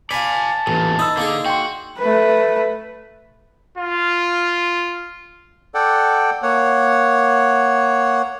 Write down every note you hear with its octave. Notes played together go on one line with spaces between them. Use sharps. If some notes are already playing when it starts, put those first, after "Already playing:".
D5 F5 G#5 A5 B5 B6
A1 E2 A#2
D#4 B5 D#6 E6
D3 A#3 D#4 G#4
F#4 G5 C6
A3 B4
F4
A4 D5 F#5 G5
A#3 C#5 F#5